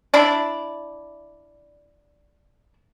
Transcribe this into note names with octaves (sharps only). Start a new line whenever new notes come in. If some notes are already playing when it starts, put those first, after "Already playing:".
D4 E4 D5